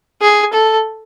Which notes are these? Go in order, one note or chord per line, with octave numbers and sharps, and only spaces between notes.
G#4
A4